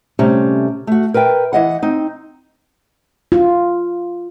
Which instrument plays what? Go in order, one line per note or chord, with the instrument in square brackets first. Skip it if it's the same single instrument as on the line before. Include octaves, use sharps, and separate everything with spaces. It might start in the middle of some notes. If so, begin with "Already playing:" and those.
[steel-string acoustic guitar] C3 G3 A3 C#4
A3 F#4
A#4 B4 E5 G5
E3 D#5 F#5
C4 D#4
[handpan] F4